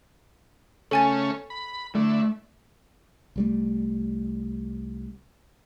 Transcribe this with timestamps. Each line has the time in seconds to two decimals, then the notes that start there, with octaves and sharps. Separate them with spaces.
0.91 C#3 A3 C#4 A4 G#5 A6
1.50 B5
1.95 D3 A3 E4
3.36 C2 G3 A3